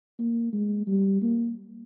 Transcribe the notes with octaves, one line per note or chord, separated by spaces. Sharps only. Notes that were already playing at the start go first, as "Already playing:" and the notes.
A#3
G#3
G3
A#3